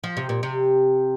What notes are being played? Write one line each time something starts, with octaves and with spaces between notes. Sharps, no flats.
F3
C3
A#2
C3